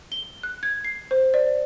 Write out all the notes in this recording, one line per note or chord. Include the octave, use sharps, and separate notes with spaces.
G7
F#6
G#6
C7
C5
D5